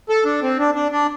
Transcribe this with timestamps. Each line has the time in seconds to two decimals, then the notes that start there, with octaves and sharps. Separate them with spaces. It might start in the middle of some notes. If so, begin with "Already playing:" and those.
0.09 A4
0.25 D4
0.43 C4
0.59 D4
0.75 D4
0.92 D4